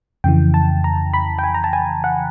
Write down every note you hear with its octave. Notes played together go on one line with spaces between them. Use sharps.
F2 C#3 E3 G5
A5
A#5
B5
G5
G#5
A#5
A5
G#5
F#5